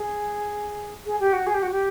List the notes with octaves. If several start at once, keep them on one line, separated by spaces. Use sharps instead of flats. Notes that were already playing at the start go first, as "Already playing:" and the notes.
Already playing: G#4
G#4
G4
F#4
G#4
G4
F#4
G4